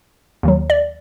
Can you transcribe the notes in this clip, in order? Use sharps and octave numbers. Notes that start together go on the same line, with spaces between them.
D#2 D#3 F#3
D5